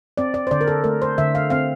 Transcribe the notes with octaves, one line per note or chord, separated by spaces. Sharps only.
C4 D5
D5
C5
D3 D5
A#4
A4
A3 A#4
C5
D3 E5
F5
C4 F5